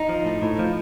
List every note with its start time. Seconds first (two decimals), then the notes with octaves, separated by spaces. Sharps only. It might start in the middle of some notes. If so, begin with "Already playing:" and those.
Already playing: D#4
0.09 F3
0.25 A2
0.42 A2
0.59 F3